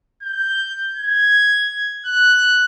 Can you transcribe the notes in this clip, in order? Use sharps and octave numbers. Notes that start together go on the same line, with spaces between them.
G6
G#6
F#6